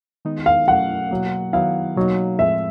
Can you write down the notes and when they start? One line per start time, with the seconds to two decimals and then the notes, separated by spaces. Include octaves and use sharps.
0.25 D#3 G#3 B3 D#4
0.46 F5
0.68 B2 F#3 A3 C#4 F#5
1.11 B2 F#3 A#3
1.53 D#3 F#3 B3 E4 F5
1.96 B2 F#3 A#3 D#4
2.39 A2 F3 G#3 C4 E5